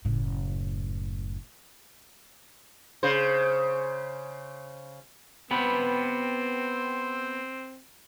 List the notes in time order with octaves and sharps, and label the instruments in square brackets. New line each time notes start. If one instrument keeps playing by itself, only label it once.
[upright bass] F#1 A2
[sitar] C#3 C5
[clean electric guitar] B3 G4 B4 [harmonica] C4